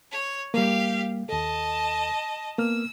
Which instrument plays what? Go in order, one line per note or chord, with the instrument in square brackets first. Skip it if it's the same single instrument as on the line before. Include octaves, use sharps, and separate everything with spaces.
[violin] C#5
[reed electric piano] G3 A#3 [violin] G4 F5
[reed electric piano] D#2 A4 [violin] D#5 A5
[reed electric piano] A#3 B3 F6 [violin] E6